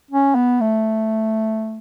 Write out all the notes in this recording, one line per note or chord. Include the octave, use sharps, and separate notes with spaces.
C#4
B3
A3